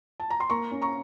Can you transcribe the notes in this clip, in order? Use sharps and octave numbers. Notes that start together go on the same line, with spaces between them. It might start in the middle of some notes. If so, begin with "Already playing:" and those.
A5
A#5
C6
A#3 A#5 C#6
C#4
A#5 C#6